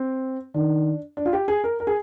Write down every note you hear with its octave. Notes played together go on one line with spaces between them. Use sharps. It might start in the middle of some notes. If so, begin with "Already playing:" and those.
Already playing: C4
D#3 D4
D4
F4
G4
G#4
A#4
A#4
G#4